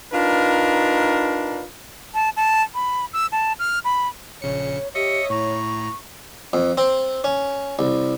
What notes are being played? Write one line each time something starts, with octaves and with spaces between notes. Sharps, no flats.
D4 D#4 F4 A#4 B4
A5
A5
B5
E6
A5
F6
B5
A#1 C#3 C#5 C#7
G4 C#5 D#5 E5 D#6 C#7
A2 E4 A#5 C#6
F2
C4
C#4
C2